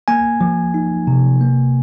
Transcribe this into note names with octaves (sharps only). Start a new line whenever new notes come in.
A#3 G#5
F3
D#4
C3
A#3